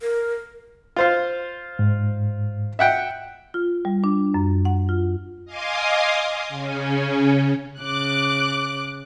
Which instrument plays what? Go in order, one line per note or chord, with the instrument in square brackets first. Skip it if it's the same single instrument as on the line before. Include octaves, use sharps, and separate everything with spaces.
[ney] A#4
[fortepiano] F4 C5 F5
[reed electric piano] G#2
[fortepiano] E5 F#5 G5
[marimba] F4
G3
D4
F#2
F#5
F4
[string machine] D#5 F5 G#5 C6 D6 D#6
C#3 C#4
[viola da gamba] C#3 [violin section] D6 F#6